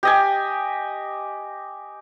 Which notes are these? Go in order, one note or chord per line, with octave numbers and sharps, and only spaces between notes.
G4 D#5 G#5